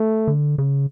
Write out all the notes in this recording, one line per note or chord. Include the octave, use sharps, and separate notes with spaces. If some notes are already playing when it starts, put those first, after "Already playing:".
Already playing: A3
D3
C#3